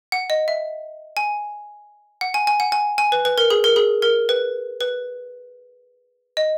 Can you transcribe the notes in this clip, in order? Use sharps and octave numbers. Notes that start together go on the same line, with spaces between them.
F#5
D#5
E5
G#5
F#5
G#5
G#5
F#5
G#5
G#5
B4
B4
A#4
G#4
A#4
G#4
A#4
B4
B4
D#5